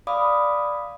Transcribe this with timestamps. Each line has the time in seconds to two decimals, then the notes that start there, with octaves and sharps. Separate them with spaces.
0.07 D5 F5 B5 D6 D#6